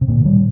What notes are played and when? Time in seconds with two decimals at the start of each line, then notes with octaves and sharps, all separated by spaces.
0.01 C3
0.08 A#2 D3
0.25 D#3 G3